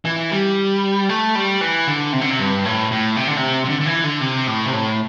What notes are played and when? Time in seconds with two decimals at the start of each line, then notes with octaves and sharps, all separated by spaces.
0.05 E3
0.31 G3
1.09 A3
1.35 G3
1.61 E3
1.87 D3
2.13 C3
2.21 D3
2.30 C3
2.39 G2
2.65 A2
2.92 A2
3.16 C3
3.27 D3
3.37 C3
3.64 C3
3.69 D3
3.81 D3
3.86 E3
4.04 D3
4.21 C3
4.47 A2
4.66 C3
4.73 A2